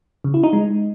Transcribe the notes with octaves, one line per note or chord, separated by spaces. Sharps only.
C#3
E4
D#4
G#3